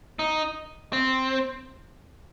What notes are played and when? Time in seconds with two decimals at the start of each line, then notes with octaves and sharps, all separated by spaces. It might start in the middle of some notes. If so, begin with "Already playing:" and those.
0.19 D#4
0.93 C4